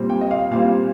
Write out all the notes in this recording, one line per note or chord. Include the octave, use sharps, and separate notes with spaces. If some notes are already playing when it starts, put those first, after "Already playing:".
Already playing: A#2 G3 C4
G5
D#5
F5
A#2 G3 C4 F5